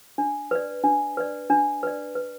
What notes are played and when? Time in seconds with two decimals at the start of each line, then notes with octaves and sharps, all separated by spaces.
0.18 D4
0.51 B4 D5
0.84 D4
1.17 B4 D5
1.50 D4
1.83 B4 D5
2.15 B4